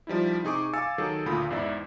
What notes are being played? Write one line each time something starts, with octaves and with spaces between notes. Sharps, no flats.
F3 G3 D#4 E4
C3 D#4 G#4 C#6 D6
F5 G#5 D6 E6 A6 C#7
D#3 F#3 G#4 A4
D2 A#2 F4 B5 D#6
E2 G#2 E4 D5 E5